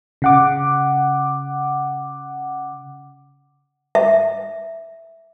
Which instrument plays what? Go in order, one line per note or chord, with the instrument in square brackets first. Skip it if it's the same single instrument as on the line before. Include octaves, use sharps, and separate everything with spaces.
[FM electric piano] C#3 F#5 D6
[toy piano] E5